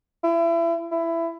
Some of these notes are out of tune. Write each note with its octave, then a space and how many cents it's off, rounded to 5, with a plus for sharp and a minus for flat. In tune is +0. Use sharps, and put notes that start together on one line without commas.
E4 +30
E4 +15